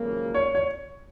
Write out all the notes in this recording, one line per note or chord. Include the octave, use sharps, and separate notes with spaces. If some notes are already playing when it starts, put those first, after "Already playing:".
Already playing: G#1 F#2 C#3 F3 A#3
C#5
C#5